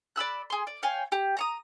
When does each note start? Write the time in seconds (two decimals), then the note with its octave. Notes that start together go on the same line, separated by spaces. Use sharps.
0.16 D5 B5 E6 F#6
0.50 G#4 C6
0.67 D5
0.83 C#5 F5 G5 G#5
1.12 G4
1.37 A#5 C#6 D#6